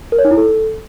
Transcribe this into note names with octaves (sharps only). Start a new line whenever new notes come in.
A#4
C#5
D#4
E4
A4